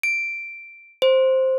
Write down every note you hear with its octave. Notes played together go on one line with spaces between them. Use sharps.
D7
C5